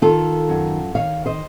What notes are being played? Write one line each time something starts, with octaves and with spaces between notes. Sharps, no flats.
D#3 F4 A4
F#2
D#3 C#5 F5
C5 D#5